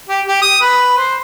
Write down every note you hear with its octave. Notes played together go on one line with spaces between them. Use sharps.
G4
G4
D#6
B4
C5